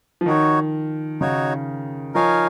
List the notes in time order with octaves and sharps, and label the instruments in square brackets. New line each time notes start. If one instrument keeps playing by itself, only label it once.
[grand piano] F3
[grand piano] D#3 [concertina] D#4 F#4 C#5
[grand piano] C#3 [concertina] D#4 F#4 C#5
[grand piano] F3 [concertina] D#4 A#4 C#5 F5 G#5